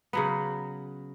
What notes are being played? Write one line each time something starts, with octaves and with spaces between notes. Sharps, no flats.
C#3 F#3 B3